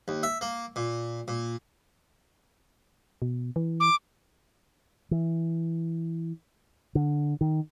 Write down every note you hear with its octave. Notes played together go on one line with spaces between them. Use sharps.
D#2
E5
A#3
A#2
A#2
B2
E3
D6
E3
D3
D#3